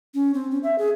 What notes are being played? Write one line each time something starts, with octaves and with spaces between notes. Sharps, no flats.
C#4
C4
C#4
E5
G#4